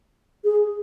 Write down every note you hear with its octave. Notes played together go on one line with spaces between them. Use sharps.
G#4